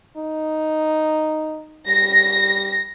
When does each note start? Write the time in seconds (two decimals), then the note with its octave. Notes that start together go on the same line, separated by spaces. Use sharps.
0.17 D#4
1.87 G3 A#6